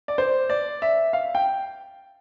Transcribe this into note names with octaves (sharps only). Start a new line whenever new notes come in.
D5
C5
D5
E5
F5
G5